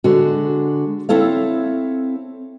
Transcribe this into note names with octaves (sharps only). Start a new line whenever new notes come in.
D3 G#3 F#4
C4 E4 A4 C#5 F5